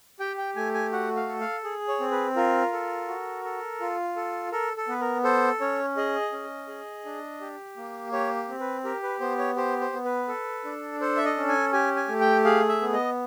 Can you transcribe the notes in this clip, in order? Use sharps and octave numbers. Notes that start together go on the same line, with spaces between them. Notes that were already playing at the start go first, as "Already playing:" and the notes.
G4 G5
G5
A3 G#5
G#5
F#4 F#5
F5
A4
F5
G#4
C#5
C4
B4
F4 A#4
A4
F#4
A4
F4
A4
A4 A#4
A4
B3 B4
A#4
A4 C5
C#4 C#5
G#4 D#5
C#4
G#4
D4
G4
A#3
G4 C#5
C4
B4
G4 A#4
B4
B3 C5
C#5
G4 C5
C5
B3
B4
A4
D4
A4 C5
E5
D#5
C#4
G#5
G4 G#5
G#5
A3
G5
G#4 F5
E5
B3
D#5